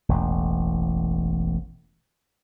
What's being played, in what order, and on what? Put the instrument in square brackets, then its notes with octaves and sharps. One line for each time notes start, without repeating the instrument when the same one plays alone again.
[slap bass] E1 A1 E2